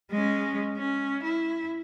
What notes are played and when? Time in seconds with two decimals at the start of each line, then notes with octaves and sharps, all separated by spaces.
0.11 G#3 C#4
0.77 C#4
1.24 E4